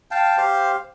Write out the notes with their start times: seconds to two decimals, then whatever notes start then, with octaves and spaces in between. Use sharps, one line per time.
0.11 F5 G5 A5
0.37 G4 C5 F5